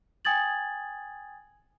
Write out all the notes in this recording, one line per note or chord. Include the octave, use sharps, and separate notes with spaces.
G5 G#5 D#6 G#6 A6 F#7